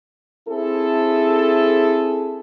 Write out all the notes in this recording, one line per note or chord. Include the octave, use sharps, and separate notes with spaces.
C4 E4 G#4 A4